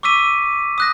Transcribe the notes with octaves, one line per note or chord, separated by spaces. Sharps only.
C#6 D6 E6 B6 D#7
D#6 F#6 A#6